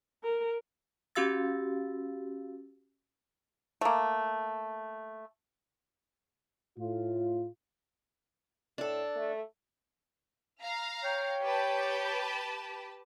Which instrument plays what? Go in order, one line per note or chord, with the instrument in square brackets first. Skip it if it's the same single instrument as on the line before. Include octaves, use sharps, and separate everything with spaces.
[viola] A#4
[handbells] C#4 F#4 G4 F5 E6 A6
[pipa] A3 A#3
[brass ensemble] A2 F4
[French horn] A2 [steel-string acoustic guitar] D4 A4
[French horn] A3
[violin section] F5 A#5
[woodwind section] C#5 G5
[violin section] G4 B4 A5